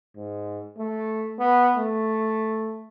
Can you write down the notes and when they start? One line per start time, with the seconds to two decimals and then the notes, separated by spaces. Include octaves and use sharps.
0.16 G#2
0.78 A3
1.39 B3
1.77 A3